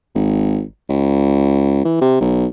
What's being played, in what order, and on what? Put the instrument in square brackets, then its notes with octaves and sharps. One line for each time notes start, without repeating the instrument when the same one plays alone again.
[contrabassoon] G#1
C#2
E3
C3
B1